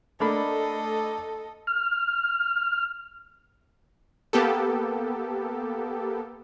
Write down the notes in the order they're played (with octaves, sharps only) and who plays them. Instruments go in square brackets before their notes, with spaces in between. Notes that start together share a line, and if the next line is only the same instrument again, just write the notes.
[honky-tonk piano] A3 [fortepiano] A#3 D4 B5 [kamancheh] A4 D#5
[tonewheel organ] F6
[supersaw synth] A#3 B3 G4 A4